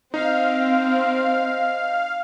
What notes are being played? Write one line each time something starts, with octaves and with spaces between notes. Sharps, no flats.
C4 D#4 F5